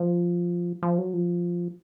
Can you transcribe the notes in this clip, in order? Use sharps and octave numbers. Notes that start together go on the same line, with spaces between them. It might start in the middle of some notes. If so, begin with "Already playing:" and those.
Already playing: F3
F3
F#3
F3